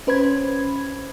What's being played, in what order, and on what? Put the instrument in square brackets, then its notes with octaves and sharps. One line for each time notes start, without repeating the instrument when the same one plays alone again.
[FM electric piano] C#4 B4 C5 B5 G#6